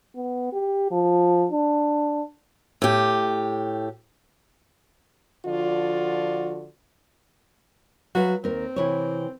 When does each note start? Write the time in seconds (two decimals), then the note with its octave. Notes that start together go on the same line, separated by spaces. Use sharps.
0.16 B3
0.53 G4
0.91 F3
1.52 D4
2.82 A2 G4
5.46 D3 F3 F4 F#4 D5
8.15 F#3 F#4 B4 F5
8.44 D#2 C4 A#4
8.76 C3 E3 C#5